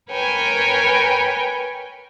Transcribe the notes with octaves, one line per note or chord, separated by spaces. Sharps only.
A#4 B4 C#5 G5 G#5